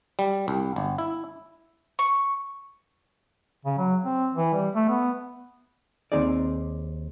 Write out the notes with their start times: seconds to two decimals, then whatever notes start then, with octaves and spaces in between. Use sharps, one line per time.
0.19 G3
0.48 C2
0.76 G1
0.98 E4
1.99 C#6
3.65 C#3
3.78 F#3
4.04 C4
4.34 E3
4.54 G3
4.75 A3
4.89 B3
6.12 D#2 C3 C4 D#4 G#4 D5